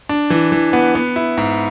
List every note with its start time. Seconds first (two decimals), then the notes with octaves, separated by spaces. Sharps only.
0.09 D4
0.30 E3
0.52 E3
0.73 B3
0.95 B3
1.16 E4
1.37 G#2